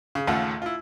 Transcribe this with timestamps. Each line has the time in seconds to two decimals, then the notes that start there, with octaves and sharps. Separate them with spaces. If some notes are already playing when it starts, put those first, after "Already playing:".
0.15 C#3
0.27 A1 D#2 C#3 A3 F4 F#5
0.62 E4 F4